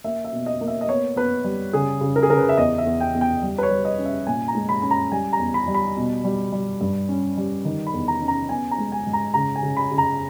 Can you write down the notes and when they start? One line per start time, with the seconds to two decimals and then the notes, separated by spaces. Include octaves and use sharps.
0.04 A#3 E5
0.25 E5
0.32 B2
0.46 D#5
0.61 A#3
0.67 E5
0.81 D#5
0.88 B3 C#5
1.16 B3 B4
1.44 G3
1.73 C#3 G#4
2.01 C#3
2.16 A#4
2.23 G#4
2.30 C#3 A#4
2.37 B4
2.49 E5
2.57 E2 D#5
2.78 E5
2.85 E2
3.01 G5
3.15 E2
3.21 G5
3.43 G3
3.58 B4
3.63 C#5
3.70 G3
3.85 D#5
3.99 C#4
4.05 E5
4.26 A#2 G#5
4.48 A#5
4.55 G#3
4.69 B5
4.82 C#4 B5
4.91 A#5
5.11 G3 G#5
5.33 A#5
5.39 E2
5.54 B5
5.68 G3
5.74 B5
5.97 B2
6.24 G3
6.52 G3
6.81 G2
7.09 C#4
7.37 G3
7.65 D#3
7.87 B5
7.93 E2
8.08 A#5
8.22 C#4
8.28 A#5
8.49 B3 G#5
8.71 A#5
8.78 G#3
8.92 G#5
9.07 G#2
9.13 A#5
9.34 C#3 A#5
9.56 G#5
9.63 C#3
9.77 B5
9.91 C#3
9.98 A#5